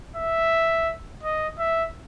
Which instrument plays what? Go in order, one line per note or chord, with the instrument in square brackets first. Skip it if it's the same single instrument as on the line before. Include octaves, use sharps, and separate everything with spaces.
[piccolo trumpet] E5
D#5
E5